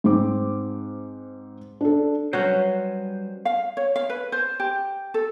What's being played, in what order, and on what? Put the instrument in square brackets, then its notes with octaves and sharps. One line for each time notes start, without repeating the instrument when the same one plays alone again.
[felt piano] G#2 C4 D6
D4 A4
[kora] F#3 C#4 [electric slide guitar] G3 B4 C5
[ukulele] F5
C#5
F5
B4
C5
G4
A4